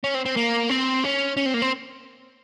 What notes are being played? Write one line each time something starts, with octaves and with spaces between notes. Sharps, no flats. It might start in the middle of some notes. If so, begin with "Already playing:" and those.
C#4
C4
C4
A#3
C4
C#4
C#4
C4
A#3
C4